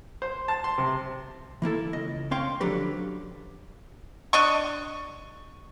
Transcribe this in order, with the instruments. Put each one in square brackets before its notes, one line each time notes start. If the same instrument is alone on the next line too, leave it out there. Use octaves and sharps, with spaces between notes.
[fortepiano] C5
A5
C6
C3
[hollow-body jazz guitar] E3 A#3 E4 A4
C#2 D#5
C4 C#4 C#5 F5 G5 C6
D3 F3 F#3 G4 B4
[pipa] D4 D#5 C#6